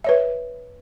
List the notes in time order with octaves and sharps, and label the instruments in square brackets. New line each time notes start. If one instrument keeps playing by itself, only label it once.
[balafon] B4 C#5 E5